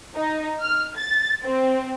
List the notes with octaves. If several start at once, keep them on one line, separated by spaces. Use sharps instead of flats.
D#4
F6
A6
C4